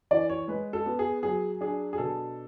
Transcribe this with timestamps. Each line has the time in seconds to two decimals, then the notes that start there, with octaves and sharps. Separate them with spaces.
0.11 E3 D5
0.29 C#5
0.48 G#3 B4
0.73 A4
0.86 B3
0.99 G#4
1.23 F#3 G#4
1.61 D4 G#4
1.93 G#4
1.98 B2 A4